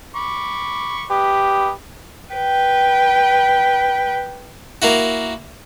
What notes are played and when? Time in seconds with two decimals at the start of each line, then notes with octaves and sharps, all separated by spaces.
0.16 B5 C#6 D6
1.10 G4 B4 D#5
2.31 B4 G5
4.82 A#3 E4 F#4